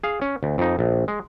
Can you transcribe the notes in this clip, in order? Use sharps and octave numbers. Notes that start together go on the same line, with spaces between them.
G#4 F5
C#4
D2
F2 D#4
A#1
G#3